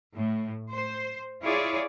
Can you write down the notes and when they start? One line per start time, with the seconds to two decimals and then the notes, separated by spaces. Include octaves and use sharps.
0.14 A2
0.70 C5
1.42 E4 F4 G#4 C#5 D5